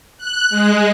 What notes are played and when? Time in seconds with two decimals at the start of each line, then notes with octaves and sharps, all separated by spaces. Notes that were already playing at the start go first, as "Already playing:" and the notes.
0.18 F#6
0.50 G#3